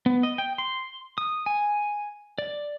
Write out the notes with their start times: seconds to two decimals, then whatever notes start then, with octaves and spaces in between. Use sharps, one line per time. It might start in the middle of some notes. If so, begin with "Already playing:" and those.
0.06 B3
0.23 D#5
0.38 G5
0.58 C6
1.18 D#6
1.46 G#5
2.38 D5